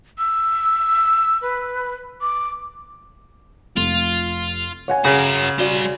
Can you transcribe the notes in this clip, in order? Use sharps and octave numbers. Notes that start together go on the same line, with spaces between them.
E6
B4
D6
F1 F4
C#5 F#5 G#5
C#3 F#4 A#4
G3 F#4 D5 C6